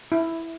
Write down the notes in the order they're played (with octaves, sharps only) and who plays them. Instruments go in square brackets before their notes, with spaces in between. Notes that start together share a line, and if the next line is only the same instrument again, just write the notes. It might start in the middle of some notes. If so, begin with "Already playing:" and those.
[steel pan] E4